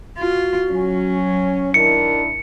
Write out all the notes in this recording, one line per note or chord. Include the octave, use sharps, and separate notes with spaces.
F4 F#4
F#3 C#4
D#3 D4 E4 A#4 C#7